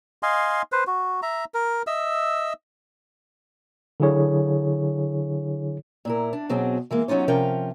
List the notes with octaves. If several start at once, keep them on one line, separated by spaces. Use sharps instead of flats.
D#5 F5 G#5 C6
B4 C5
F#4
E5 A#5
A#4
D#5 E5 E6
D3 F#3 E4 G#4 C#5
A#2 E4 A#4
D4
B2 F#3 C4 G#4
E3 G#3 A#3
F#3 C#4 D#4 F4 C#5
C3 F3 C#4 F4 A#4 G5